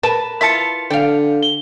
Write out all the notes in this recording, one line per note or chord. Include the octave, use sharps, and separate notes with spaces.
A#4 B4 A5
E4 F4 A5 B6 C#7
D3 D5 F5 G5
G7